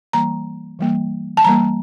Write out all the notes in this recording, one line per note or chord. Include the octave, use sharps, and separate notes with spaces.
E3 G3 A#3 A#5
E3 G3 A#3
A5
E3 G3 A#3 A#5